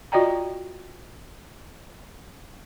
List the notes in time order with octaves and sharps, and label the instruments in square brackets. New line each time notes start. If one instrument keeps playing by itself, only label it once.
[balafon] F4 F#4 D5 D#5 G5 A#5